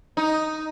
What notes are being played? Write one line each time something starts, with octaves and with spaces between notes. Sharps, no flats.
D#4